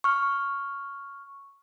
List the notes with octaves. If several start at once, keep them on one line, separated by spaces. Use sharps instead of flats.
C#6 F6